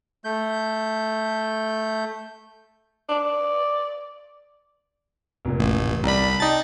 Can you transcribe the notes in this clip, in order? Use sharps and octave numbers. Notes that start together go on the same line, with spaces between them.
A3 G6
D5
F1 A#2
A1
C2 D5 A#5 B5
D#4 D5 G5 A5 A6